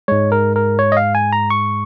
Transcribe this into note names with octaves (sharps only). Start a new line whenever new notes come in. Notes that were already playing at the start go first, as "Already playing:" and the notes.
G#2 G#3 C#5
A#4
A#4
C#5
D#5
F5
G#5
A#5
C#6